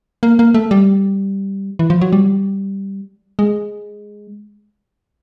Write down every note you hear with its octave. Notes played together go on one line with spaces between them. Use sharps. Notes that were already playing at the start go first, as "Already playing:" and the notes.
A#3
A#3
A3
G3
E3
F3
F#3
G3
G#3